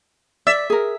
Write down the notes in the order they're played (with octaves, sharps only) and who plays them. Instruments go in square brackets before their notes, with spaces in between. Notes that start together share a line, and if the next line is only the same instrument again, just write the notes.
[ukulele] D5 [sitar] E5
[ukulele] G#4 A#4